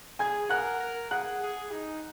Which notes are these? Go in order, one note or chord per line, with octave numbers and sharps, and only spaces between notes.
G#4 G#5 G#6
A#4 F#5 F#6
A#4
G#4 F#5 F#6
G#4
D#4